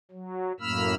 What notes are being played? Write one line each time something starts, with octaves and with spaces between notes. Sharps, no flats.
F#3
F#2 A2 A#3 B5 E6 F6